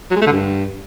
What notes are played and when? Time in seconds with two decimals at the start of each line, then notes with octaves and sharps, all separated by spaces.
0.11 F#3
0.16 G#3
0.21 A3
0.27 D3
0.32 G2